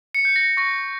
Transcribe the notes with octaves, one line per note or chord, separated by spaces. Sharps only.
C#7
G6
A#6
C#6 A#6